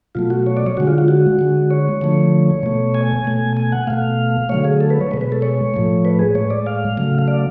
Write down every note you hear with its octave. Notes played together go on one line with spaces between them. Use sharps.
B2 F#3 A3 F4
F#4
C#5
D5
C#5
D3 G#3 F#4
F4
F4
F#4
D3 G#3
C#5
D3 F3 A3
B2 A3
G#5
B2 A3
G#5
F#5
B2 A3 F5
D3 F#3 A3 C#5
G#4
A4
B4
C#5
B2 G#3 B4
B4
A4
C#5
A2 F3 A3
B4
G#4
A2 G#3 C#5
D5
F5
C#3 F#3 A3
F5
D5